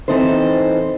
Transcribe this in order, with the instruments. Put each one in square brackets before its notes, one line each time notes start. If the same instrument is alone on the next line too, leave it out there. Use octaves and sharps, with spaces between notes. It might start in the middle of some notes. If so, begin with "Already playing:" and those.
[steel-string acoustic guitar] E3 C4 D#4 A4 C5